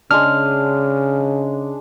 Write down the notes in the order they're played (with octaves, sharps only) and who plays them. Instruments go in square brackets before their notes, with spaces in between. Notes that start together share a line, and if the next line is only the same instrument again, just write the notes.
[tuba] C#3 [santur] G#3 D4 [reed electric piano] F6